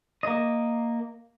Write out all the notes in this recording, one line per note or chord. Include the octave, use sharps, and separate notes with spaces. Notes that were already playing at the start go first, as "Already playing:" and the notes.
A#3 D#5